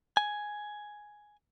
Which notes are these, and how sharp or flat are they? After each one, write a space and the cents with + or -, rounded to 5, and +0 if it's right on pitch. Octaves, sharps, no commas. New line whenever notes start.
G#5 +5